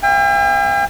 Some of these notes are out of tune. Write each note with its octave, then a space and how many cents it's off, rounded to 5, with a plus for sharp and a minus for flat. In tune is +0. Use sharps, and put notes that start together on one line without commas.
B3 +0 E5 +40 G5 +45